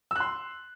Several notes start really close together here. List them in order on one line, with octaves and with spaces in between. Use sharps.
E6 F#6 C6